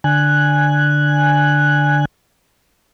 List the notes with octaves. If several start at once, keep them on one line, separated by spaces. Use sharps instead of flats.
D3 G#5 F#6